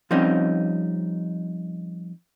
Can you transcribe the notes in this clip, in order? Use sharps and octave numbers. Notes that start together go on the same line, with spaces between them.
F3 G3 C4 C#4 D#4